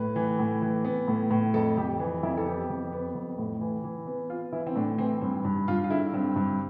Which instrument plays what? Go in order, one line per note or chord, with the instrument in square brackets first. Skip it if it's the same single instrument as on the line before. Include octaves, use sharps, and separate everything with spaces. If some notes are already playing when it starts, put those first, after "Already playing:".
Already playing: [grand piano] A2 B4
E3
A2
E3
B3
A2
A2
F2 A4
F2 G4
E3
F2 E4
A4
B3 G4
F2
B3
F2
A2
E3
E3
B3
B3 F4
E3 E4
C4
A2 D4
E3 C4
G2 C4
G2
G2 F4
F4
D3 E4
G2 C4
G2